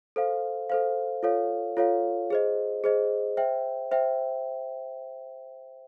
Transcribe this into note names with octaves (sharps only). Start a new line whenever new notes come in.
A4 C5 F5
A4 C5 F5
F4 A4 C#5 F5
F4 A4 C#5 F5
G#4 C5 D#5
G#4 C5 D#5
C5 E5 G5
C5 E5 G5